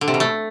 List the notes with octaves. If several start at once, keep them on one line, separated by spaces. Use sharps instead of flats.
D3
C3
B2
A3